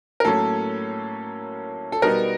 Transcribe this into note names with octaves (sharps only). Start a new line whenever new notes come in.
A#4
A2 F#3 A#3 C#4 A4
A4
B2 G3 B3 D#4 A#4